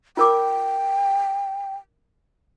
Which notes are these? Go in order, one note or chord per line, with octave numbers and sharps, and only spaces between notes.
F4 A#4 G5 D6